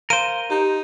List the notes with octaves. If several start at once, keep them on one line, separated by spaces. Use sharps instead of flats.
A#4 C5 F5 D#7
D#4 G4